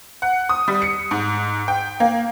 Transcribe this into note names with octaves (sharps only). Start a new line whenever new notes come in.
F#5
D#6
G3
C#7
G#2
G5
A#3